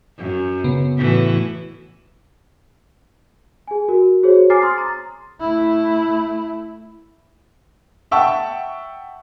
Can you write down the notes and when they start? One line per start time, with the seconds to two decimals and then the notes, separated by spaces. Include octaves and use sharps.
0.18 F#2
0.64 C#3 B3
0.97 A2 E3 F#4
3.68 G#4 G#5
3.88 F#4 A#4
4.23 F#4 G#4 C5 C#5
4.50 G#5 A#5 D6 F6 A6 C7
4.62 C6 D#6 A6
4.78 A#5
5.40 A3 E4
8.11 E5 F#5 G5 A5 C#6 E6